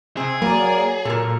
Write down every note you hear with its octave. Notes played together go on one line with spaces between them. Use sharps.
C3 C4 G#4
F#3 A#3 A#4 D5
A#2 A4 A#4